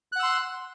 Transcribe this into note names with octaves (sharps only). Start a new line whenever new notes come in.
F#5 C6 E6 F#6